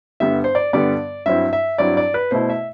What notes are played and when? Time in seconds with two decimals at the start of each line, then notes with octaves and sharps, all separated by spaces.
0.20 G2 D3 G3 B3 E5
0.44 C5
0.55 D5
0.73 G2 D3 G3 B3 D5
1.26 G2 F#3 C4 E4 E5
1.53 E5
1.78 G2 F#3 C4 E4 D5
1.97 D5
2.14 B4
2.31 B2 A3 E4 C5
2.50 E5